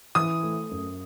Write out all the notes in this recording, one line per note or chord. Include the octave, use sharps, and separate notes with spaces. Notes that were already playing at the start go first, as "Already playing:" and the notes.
E3 D#6
A3
F#2